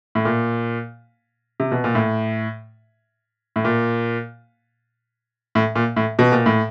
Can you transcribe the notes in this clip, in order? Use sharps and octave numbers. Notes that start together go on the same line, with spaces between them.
A2
A#2
C3
B2
A#2
A2
A2
A#2
A2
A#2
A2
B2
A#2
A2